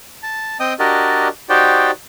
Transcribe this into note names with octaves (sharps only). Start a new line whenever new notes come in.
A5
C4 D#5 G5 D#6
D4 F#4 G4 A#4 D5 D#5
D#4 F#4 G4 C5 D5 G5